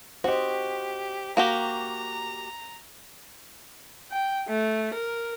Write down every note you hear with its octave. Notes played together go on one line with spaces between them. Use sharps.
F#4 G4 C5 D#5
A#3 F#4 G4 A#5
G5
A3
A#4